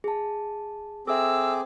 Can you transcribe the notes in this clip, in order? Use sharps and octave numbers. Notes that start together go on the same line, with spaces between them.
G#4 A5
C4 G#4 A4 E5 D6 E6